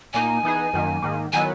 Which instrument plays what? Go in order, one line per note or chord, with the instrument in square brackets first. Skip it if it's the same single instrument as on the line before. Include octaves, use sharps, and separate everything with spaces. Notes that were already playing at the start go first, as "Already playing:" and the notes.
[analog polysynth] A#2 A#3 D#4 [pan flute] G#5
[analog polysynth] E3 B3 D#4 G#4
F#2 D#3 A#3
G#2 D#3 A#3
[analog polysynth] D#3 F#3 B3 E4 [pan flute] G#5